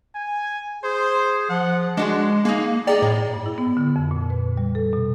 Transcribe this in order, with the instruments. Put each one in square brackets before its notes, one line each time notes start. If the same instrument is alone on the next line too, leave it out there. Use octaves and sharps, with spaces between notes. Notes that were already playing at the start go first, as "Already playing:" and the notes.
[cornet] G#5
[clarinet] G#4 [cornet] C5
[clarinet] F3 [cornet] F#5
[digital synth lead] G#3 [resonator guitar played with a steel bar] D4 F#4 G#4
[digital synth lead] A#3 [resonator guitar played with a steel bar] D#4 G#4
[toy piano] G#4 G5 [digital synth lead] D5 [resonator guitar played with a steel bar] D#5 A#5
[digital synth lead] A2
[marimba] G2
E4
B3
D3
F2
A#2
B4
G3
A4
B2